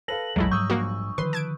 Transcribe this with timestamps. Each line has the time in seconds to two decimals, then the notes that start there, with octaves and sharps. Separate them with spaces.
0.08 A4 B4 F5 A#6 F#7
0.36 A#1 E2 F#3 G#3 A3 E4
0.51 G#2 F3 G3 C#6 D#6 E6 G6
0.70 A#1 A#3 F#4
1.18 D3 D#3 F3 B4 C6
1.33 A5 G#6 D7